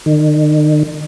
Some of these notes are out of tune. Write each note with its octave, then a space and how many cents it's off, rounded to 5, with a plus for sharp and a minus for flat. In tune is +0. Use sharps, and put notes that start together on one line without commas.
D#3 -40